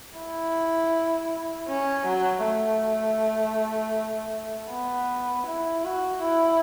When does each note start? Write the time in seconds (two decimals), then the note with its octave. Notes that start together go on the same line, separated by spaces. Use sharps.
0.17 E4
1.68 C#4
2.06 F#3
2.44 A3
4.71 B3
5.47 E4
5.84 F#4
6.22 E4